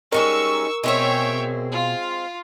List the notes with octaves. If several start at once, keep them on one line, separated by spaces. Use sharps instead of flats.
G3 G#3 C#4 D#4 A#4 C#6 E6
B2 G#3 C4 G#4 C#5 E5 G5
F4